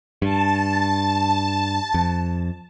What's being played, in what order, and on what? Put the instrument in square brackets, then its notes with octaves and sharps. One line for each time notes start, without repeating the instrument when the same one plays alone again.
[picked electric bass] G2 [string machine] A5
[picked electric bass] F2